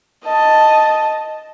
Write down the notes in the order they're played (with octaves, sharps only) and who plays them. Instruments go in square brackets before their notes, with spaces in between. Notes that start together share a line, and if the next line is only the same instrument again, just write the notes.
[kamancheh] D#5 A5